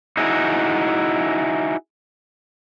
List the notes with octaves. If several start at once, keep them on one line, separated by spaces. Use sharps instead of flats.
D#4 E4 F#4 G#4